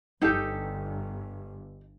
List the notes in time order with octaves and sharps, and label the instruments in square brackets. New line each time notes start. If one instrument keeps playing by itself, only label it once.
[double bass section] G1 [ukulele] D#4 G4 A4